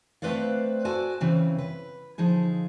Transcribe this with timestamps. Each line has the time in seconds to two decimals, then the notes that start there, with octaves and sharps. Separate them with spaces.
0.22 A3 C4 B4 C5 D5 F5
0.85 F#4 A4 C5 D5 G#5
1.21 C#3 E3 C4
1.58 B4
2.18 D3 F3 D#4 G#4